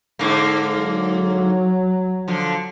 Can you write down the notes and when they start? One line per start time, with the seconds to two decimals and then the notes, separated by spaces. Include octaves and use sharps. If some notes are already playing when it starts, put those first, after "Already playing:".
0.19 G#2 D3 A#3
0.75 F#3
2.28 D3 F3